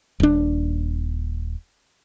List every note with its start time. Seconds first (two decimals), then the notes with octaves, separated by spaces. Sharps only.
0.20 D#1 D4